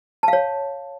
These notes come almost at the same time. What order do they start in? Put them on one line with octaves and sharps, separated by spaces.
A5 F5 C#5